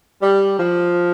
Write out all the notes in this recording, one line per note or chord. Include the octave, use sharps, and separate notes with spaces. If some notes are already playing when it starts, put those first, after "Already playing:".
G3
F3